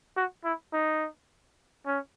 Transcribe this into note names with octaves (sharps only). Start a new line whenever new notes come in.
F#4
E4
D#4
C#4